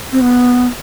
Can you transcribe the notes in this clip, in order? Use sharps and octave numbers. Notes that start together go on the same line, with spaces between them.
C4
B3